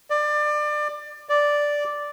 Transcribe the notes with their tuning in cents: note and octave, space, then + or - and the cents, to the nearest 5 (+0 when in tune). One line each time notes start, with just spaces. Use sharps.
D5 +25
D5 -5